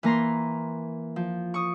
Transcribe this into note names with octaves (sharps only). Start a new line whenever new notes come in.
E3 A#3 A#5 C6
F3
C#6 D#6